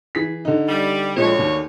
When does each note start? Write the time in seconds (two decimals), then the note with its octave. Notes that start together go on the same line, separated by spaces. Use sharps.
0.15 E3 G#4 B6
0.45 D3 D#4
0.69 G3
1.16 D2 A#2 F3 G#3 C#5
1.39 D#2